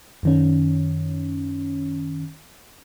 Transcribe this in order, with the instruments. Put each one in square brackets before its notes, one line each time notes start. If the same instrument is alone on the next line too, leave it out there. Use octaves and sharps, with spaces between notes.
[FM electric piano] F#2 D#3 C#4